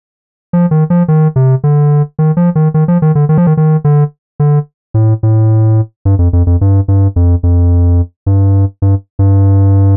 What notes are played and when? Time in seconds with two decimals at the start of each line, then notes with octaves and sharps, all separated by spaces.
0.53 F3
0.71 D#3
0.90 F3
1.08 D#3
1.36 C3
1.64 D3
2.19 D#3
2.37 F3
2.55 D#3
2.74 D#3
2.88 F3
3.02 D#3
3.15 D3
3.29 D#3
3.38 F3
3.47 D#3
3.57 D#3
3.84 D3
4.40 D3
4.94 A2
5.23 A2
6.05 G2
6.19 F2
6.33 F2
6.47 F2
6.61 G2
6.88 G2
7.16 F2
7.43 F2
8.26 G2
8.82 G2
9.19 G2